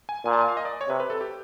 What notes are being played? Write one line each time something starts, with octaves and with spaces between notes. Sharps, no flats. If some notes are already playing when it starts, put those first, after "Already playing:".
G#5
A#2 G#5
A5
G#5
F5
D#5
D5
C#5
C3 B4
B4
A4
G4